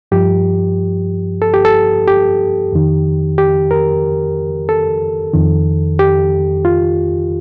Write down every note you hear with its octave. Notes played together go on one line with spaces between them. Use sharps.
G2 F3 G4
A4
G4
A4
G4
F2 D#3
G4
A#4
A4
F2 D#3
G4
F4